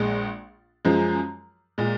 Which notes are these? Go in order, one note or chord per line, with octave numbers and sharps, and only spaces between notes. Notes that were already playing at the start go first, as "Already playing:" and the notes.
Already playing: A#1 G#3
F#2 F3 G#3
A#2 G#3